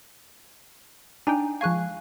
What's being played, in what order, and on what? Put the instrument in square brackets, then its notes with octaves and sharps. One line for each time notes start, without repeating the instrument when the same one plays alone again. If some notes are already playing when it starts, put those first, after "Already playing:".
[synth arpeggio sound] D4 D#4 G5 [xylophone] G#5 A#5
[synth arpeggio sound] F3 G#3 G#5 [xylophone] F5 C#6 F#6